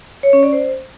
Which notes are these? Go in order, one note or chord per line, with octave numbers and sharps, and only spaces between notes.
C#5
C#4
D5
C5